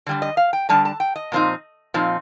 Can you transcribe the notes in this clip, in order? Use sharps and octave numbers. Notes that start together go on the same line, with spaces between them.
D3 G3 D4
D#5
F5
G5
D3 G3 D4 A5
A5
G5
D#5
A#2 F3 C4 D#4
A#2 F3 C4 D#4